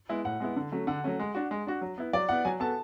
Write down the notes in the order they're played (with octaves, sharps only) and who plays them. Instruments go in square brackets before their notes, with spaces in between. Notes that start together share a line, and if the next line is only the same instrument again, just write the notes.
[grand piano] G#3 B3 E4
[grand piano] A2 [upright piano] F#5
[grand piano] G#3 B3 E4
D3
F#3 A3 C#4
[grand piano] D3 [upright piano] F#5
[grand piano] F#3 A3 C#4
G#3
D4 F#4
G#3
D4 F#4
F#3
B3 E4
[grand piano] F#3 [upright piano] D5
[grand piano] B3 E4 [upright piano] F#5
[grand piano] F#3 [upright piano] G#5
[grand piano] B3 F#4 A4 [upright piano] A5